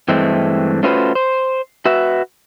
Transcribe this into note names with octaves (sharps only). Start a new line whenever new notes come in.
G2 E3 G#3 A3 C4
A3 C#4 F4 F#4 B4 C5
C5
F#4 B4 E5